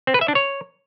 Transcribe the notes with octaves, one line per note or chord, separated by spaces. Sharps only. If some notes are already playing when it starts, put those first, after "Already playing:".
C4
B4
E5
D4
C#5